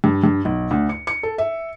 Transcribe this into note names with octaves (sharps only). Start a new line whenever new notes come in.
G2
G2
B1
D2
C#7
C#7
A4
E5